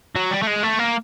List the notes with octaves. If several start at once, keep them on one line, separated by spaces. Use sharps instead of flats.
F#3
G3
A3
G#3
A3
A#3